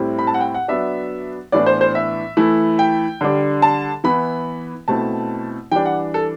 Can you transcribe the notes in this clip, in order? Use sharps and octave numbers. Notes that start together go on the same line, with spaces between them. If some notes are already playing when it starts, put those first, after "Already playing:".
Already playing: A2 G3 C4 E4
B5
A5
F#5
G5
F#5
F#3 B3 D4 E5
A2 E3 B3 D4 D5
C5
C5
E5
E3 A3 E4
G5
D3 G3 D4
A5
E3 B3 E4 B5
B2 A3 C4 E4 A5
E3 G3 D4 G5
F#5
A4